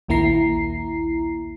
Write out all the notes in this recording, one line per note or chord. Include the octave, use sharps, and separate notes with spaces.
A#1 D#2 A#3 E4 A#5 C7